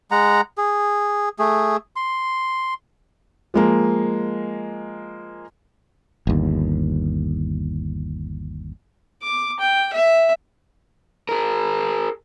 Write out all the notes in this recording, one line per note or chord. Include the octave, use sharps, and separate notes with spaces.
G#3 F#5 A#5
G#4
A3 G#4
C6
F3 G#3 A#3
G1 D#2
D6
G5
E5
G#4 A#4